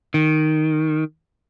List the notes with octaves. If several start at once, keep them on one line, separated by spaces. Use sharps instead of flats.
D#3